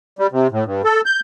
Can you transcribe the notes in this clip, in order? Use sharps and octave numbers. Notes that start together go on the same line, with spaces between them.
G3
C3
A2
G2
A4
G6